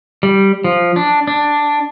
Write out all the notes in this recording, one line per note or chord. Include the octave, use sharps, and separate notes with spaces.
G3
F3
D4
D4